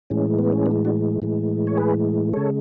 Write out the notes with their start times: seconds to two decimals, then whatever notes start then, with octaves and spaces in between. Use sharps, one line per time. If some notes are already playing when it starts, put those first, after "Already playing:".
0.10 A2 E3 G#3 C#4
0.39 B3
0.53 C#4
0.66 B3 D4
0.85 D4 F#4
1.22 A2 E3 G#3
1.67 C#5
1.77 G#4 B4
2.33 C#3 G#3 A4 C#5